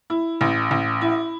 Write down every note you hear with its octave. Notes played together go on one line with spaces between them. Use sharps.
E4
A1
A1
E4